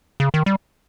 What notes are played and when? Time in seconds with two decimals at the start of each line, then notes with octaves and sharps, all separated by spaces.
0.20 C#3
0.34 D#3
0.46 G3